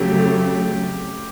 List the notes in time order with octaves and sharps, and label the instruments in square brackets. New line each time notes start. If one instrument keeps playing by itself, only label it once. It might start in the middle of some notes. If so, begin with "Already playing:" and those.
Already playing: [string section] F2 C#3 F#3 A3 [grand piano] G4